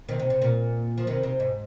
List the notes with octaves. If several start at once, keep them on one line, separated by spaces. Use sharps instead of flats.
C3 D#3
C3
C3
A#2
F3
C3 D#3
C3
G#2